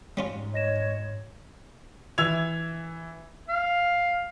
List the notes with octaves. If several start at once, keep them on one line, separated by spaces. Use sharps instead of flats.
G#2 G3 C#4 F4
C#5 D#5 A#6 E7
E3 E5 E6 G#6 F7
F5